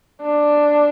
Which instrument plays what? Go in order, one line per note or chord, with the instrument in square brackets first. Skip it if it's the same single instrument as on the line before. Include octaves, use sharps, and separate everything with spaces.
[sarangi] D4